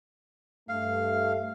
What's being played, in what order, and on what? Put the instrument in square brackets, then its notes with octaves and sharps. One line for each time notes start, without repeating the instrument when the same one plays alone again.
[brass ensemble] G2 A3 [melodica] F5